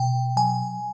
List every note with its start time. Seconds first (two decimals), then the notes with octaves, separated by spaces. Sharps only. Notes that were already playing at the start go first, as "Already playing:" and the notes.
Already playing: B2 G5
0.36 F#3 G#5